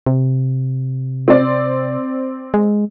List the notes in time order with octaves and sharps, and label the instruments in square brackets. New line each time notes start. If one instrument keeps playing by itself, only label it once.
[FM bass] C3
[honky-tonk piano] C4 D5
[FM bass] G#3